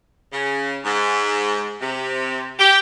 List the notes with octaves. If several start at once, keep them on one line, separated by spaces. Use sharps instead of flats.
C#3
G#2
C3
G4